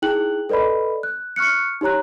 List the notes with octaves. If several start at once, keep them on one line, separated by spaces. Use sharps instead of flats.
D#4 E4 G#4 G5 F#6 F#7
A4 B4 D5 D#5 B5
F#6
C#6 F6 F#6 C#7
D#4 G4 C#5 A#5 F#6